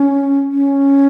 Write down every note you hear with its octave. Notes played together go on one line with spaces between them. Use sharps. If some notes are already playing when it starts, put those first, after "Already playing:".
Already playing: C#4
C#4